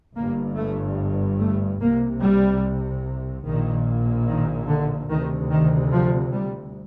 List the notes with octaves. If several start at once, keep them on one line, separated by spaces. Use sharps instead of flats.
G1 G2 A#3
A3
A3
C2 C3 A#3
G3
A#1 A#2 D#3
D#3
D3
D2 C3 D#3
D#3
F3
G3